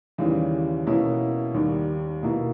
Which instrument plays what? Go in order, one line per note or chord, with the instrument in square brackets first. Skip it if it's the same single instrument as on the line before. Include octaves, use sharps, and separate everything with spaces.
[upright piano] D#2 C#3 E3 G3
B2 A#3 C#4 E4
D#2 D#3 G3
B2 A#3 E4